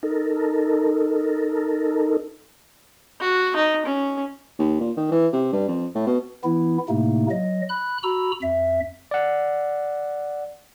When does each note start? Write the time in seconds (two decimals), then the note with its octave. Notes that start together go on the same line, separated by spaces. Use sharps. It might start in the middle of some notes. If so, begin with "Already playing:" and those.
0.03 D#4 A4 A#4
3.20 F#4
3.56 D#4
3.86 C#4
4.59 D#2
4.80 A#2
4.97 D#3
5.12 E3
5.33 C3
5.52 G2
5.68 F2
5.95 A2
6.07 B2
6.44 E3 B3 E4
6.89 A2 C3 A3 A#3 D#4
7.31 F#3 D#5
7.69 B5 F#6
8.03 F#4 A#5 B5 E6
8.42 F2 E5
9.11 D5 F#5